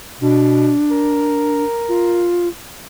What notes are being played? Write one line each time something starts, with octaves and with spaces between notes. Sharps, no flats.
B2 D4
A#4
F4